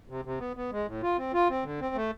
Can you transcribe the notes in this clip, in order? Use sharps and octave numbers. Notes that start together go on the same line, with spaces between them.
C3
C3
B3
B3
G#3
A2
F4
C4
F4
C4
D3
C4
A3